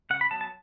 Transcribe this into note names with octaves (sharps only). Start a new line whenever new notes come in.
C#3 F#5
B5
F#3 B3 A5
A5